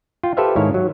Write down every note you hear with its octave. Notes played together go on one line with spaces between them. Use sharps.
F4 G5
G4 A4 B4 C5 E5 F5
G#2 D#3 E4 C#5 F5
F#3